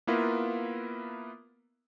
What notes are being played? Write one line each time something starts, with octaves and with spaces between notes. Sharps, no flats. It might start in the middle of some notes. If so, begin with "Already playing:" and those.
A#3 B3 E4 F4 A#4 B4